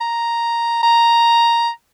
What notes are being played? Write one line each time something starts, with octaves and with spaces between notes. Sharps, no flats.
A#5
A#5